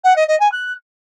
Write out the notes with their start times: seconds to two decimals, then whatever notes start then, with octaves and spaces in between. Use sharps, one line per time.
0.04 F#5
0.16 D#5
0.28 D#5
0.40 G#5
0.52 F#6